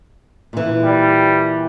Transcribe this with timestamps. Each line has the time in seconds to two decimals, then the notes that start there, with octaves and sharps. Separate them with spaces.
0.53 A#2 E3
0.83 G3